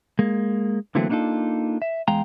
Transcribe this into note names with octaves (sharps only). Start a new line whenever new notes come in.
G#3 A#3
D3 E3 F#3 A3 A#3 C4
A#3 B3 D4 D#4 F4 A4
E5
E2 G#3 F5 G5 A#5